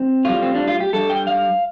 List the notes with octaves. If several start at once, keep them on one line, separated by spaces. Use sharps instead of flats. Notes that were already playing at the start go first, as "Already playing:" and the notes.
Already playing: C4
A2 G3 F4
C4
D4
F4
G4
G2 D3 G3 A4
G5
F5